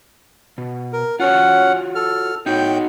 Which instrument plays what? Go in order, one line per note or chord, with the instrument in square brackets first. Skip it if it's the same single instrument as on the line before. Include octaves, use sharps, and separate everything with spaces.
[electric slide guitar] B2
[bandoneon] A#4
[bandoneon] C#4 F#5 [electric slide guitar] F4 F#4 C#5
[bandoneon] A4 F6
[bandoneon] A2 G5 G6 [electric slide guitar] D#4 F#4